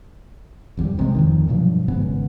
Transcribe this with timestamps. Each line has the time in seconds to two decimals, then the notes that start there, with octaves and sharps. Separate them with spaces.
0.77 G#1 E2 D#3 G3
0.97 B1 C3 F3 G#3
1.14 D1 F2 D#3
1.48 G2 B2 F3 F#3
1.88 G#1 G#2 C#3 B3